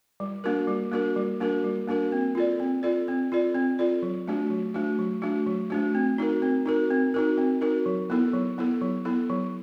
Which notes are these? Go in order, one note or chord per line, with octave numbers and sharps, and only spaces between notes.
G3
A#3 D4 F#4 A#4
G3
A#3 D4 F#4 A#4
G3
A#3 D4 F#4 A#4
G3
A#3 D4 F#4 A#4
C4
F4 A4 D5
C4
F4 A4 D5
C4
F4 A4 D5
C4
F4 A4 D5
F#3
A3 D4 F#4
F#3
A3 D4 F#4
F#3
A3 D4 F#4
F#3
A3 D4 F#4
C4
D#4 F#4 A#4
C4
D#4 F#4 A#4
C4
D#4 F#4 A#4
C4
D#4 F#4 A#4
F#3
B3 E4 A4
F#3
B3 E4 A4
F#3
B3 E4 A4
F#3